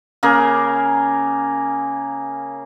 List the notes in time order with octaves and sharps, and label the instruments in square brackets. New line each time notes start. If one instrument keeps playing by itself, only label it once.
[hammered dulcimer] C#3 A#3 G#4 A#4